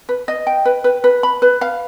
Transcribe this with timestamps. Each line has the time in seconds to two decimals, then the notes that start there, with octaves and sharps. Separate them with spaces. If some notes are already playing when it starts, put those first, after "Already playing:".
0.09 B4
0.28 D#5
0.47 G5
0.65 B4
0.84 B4
1.04 B4
1.23 B5
1.42 B4
1.61 F5